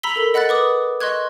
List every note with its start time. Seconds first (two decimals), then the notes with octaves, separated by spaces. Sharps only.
0.03 A#5 B5 E6 B6 G7
0.16 A4 A#4
0.34 D#5 F#5 B5 F#6 A6
0.49 B4 D6 D#6
1.01 D#5 C6 C#6 F#6 G#6